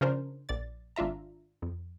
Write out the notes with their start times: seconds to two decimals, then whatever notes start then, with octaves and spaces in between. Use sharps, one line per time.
0.01 C#3 F3 C#4 D4 A#4 C5
0.49 A#1 D5 A6
0.96 G#1 D4 F4 E5 A#5
1.62 F2